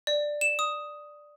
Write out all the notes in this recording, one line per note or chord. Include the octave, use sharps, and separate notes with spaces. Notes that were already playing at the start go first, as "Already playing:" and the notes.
D5
E7
D#6